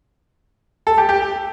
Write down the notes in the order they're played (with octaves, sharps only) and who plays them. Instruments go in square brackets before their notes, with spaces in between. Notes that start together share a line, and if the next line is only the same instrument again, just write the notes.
[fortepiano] A4
G4
G4